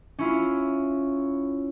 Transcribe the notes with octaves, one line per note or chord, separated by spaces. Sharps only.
C#4 E4 F4